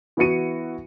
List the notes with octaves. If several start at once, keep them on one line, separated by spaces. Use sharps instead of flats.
E3 B3 E4 F#4 C#7 D#7